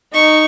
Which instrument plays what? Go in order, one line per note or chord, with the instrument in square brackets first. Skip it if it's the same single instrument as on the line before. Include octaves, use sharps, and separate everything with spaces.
[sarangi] D#4 [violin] C#6